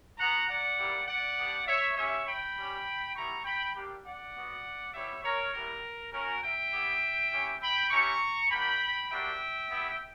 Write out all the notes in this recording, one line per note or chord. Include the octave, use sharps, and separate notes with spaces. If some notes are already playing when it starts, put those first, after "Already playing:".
B3 F#4 F#5 A#5
D5 F#5
G3 A#3 E4 G4
D5 F#5
B3 D4 G4
C#5 E5
C#4 G4 C#5 E5
G5 B5
G3 C#4 G4
G3 B3 E4 A#5 C#6
G5 B5
G3 A#3 D4 G4
D5 F#5
B3 F#4
G3 B3 E4 G4 C#5 E5
A#4 C#5
G3 B3 E4 A#4
C#4 F#4 A#4
E5 G5
B3 E4 G4
C#4 E4 G4
G5 B5
C#4 E4 G4 A#5 C#6
A#3 D4 F#4 G5 B5
G3 A#3 D4 F#4 E5 G5
B3 E4 G4